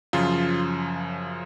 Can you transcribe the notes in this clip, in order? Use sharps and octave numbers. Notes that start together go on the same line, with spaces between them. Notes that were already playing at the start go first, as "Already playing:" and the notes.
F#2 C#3 F3 F4